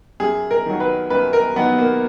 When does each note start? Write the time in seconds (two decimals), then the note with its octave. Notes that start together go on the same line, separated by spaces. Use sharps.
0.20 F#2 G#4
0.51 A#4
0.66 D#3 F#3
0.80 B4
1.10 F#2 B4
1.33 A#4
1.56 D#3 F#3 B3
1.78 A#3